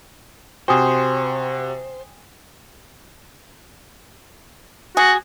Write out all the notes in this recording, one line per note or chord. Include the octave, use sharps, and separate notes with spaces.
C3 F#4 C5 G5 G#5 D#6
F#4 G#4